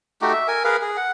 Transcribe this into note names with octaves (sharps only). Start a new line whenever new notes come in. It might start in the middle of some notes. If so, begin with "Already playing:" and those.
A3 D#4 F#4 G4
E5
A#4 G#5
G#4 A#4 B4 F5
G#4
F#5